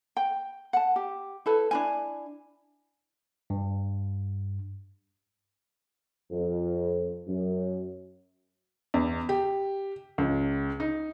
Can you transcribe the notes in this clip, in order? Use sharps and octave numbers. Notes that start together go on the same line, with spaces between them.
G5
F#5 A5
G4
E4 A4 B4
D4 E4 G#5
G2
F2
F#2
E2
G4
C#2
D#4